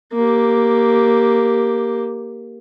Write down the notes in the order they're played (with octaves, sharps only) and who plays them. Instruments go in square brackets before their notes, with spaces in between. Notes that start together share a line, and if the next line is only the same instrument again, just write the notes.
[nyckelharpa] A#3 G4